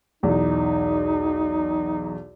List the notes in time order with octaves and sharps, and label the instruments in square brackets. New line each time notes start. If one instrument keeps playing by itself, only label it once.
[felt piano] B1 E2 [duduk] D#4